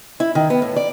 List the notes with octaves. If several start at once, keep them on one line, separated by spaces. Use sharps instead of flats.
E4
D#3
B3
A2
D5